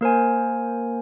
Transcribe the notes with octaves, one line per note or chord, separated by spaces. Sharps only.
A#3 A#4 C5 G#5